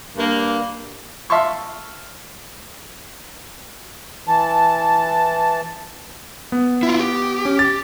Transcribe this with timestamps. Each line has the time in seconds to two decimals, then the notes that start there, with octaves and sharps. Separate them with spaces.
0.16 G2 A#3
1.30 E5 F5 A5 C6 C#6
4.27 E3 A5
6.52 B3
6.83 E4 F4
6.99 G4
7.45 C#4
7.59 A6